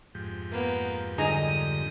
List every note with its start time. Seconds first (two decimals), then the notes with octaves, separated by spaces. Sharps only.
0.15 F2 G#2 G4
0.51 A#3 B3
1.18 D3 G3 D#4 G#4 A#5 D#6